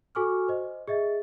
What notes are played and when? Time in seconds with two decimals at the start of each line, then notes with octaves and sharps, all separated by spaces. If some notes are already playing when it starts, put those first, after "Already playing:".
0.15 F#4 A4 G#5 C#6 D6 F6
0.48 C5 D#5
0.88 G#4 D#5 E5 A6